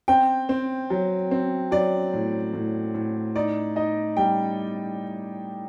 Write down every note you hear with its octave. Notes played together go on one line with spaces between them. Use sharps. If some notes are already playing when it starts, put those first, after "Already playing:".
C4 G5
C4
F#3
C4
F#3 D5
A2
A2
A2
D#4 D5
D#4 D#5
G3 G5